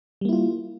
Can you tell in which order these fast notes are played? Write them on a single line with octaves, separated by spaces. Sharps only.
G3 A#3 E4 F4